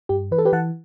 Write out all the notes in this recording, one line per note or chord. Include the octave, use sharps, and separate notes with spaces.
G2 G4
E3 B4
A4
G4 B4
E3 F#5 A5